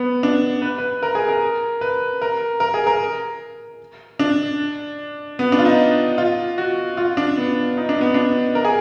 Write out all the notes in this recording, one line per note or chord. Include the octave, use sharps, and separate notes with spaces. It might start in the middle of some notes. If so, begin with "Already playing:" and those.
Already playing: B3
D4
B4
B4
A#4
G#4
A#4
B4
A#4
A#4
G#4
A#4
D4
B3
D4
F4
D#4
F4
F#4
F4
D4
B3
D#4
D4
B3
D4
A#4
G#4